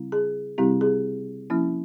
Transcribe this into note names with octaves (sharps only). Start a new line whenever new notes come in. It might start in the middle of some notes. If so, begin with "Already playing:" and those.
Already playing: C#3 G3 C4 E4
G#4
C3 G3 C4 E4 G4
G#4
F3 A#3 C#4 E4